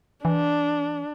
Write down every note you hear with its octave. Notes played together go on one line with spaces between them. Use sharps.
E3 D4